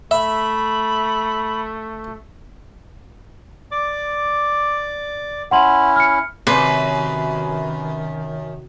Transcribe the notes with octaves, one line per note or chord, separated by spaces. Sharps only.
A3 E5 B5
D5 D6
C#4 E4 F#5 C6 F#7
F6 C#7
F#2 C3 D#3 B4